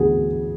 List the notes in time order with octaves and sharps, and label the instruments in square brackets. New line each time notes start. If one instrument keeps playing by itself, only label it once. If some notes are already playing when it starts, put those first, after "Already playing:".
Already playing: [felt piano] D2 E3 B3 G#4